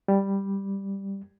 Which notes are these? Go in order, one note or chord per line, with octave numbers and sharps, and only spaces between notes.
G3